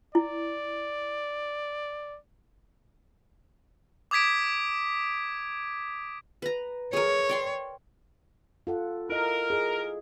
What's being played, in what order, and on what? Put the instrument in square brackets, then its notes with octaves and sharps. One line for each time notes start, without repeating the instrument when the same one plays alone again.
[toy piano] E4 [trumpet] D5
[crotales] D6 D#6 G#6 B6 D7
[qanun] B4 A#5
[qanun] G#4 A#4 [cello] C#5
[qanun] D5 G5 C6
[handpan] F4 A4 F#5
[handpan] E4 D#5 [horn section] A#4
[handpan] G#4 D#5